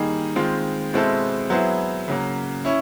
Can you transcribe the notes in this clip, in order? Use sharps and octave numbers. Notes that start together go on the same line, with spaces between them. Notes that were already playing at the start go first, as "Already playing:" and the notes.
Already playing: D#3 G3 A#3 D#4 G#4
D#3 G#3 C4 F4
B2 G#3 C4 E4 A4
F#3 B3 E4 G#4 C5
C#3 F#3 A#3
C#4 E4